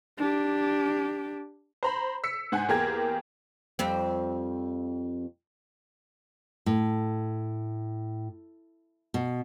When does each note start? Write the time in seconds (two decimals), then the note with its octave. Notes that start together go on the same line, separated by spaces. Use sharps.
0.18 D4 G4
1.83 C5 A#5 B5
2.24 E6 B6 C#7
2.52 G#2 F#5 G#5
2.68 E2 A#3 G4 G#4 A#4 G#6
3.79 F2 G3 C4
6.66 A2
9.14 B2